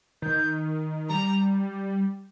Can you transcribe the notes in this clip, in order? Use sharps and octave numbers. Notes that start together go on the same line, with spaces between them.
D#3 G6
G3 A#5